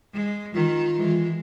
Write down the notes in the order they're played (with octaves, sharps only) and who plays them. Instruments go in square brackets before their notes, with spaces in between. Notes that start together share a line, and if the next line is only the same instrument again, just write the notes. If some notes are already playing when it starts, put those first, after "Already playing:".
[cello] G#3
[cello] D#3 [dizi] F4
[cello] E3 G#3